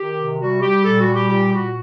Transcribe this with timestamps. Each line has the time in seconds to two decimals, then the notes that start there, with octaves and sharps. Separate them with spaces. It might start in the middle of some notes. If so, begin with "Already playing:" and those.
Already playing: D#3 G4
0.17 C3
0.39 G3 F#4
0.61 G3 G4
0.84 A#2 A4
1.00 F#4
1.07 G3
1.14 G4
1.29 A#2 G4
1.53 A#2 F#4